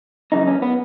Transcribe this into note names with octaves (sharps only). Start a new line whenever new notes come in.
F#2 C#3 E3 D#4
C#4
B3